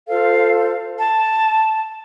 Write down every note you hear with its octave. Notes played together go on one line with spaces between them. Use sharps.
F4 A4 C5 F5
A5